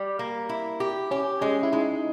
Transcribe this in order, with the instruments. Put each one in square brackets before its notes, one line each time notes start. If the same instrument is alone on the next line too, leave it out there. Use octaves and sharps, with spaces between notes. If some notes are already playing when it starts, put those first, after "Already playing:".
Already playing: [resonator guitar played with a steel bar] G3 G4
A#3
E4
G4
[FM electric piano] C#4 [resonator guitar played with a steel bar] G4
[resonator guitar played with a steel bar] G#3 [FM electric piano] C#4
[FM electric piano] E4
[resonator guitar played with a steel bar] G#3 [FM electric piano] D#4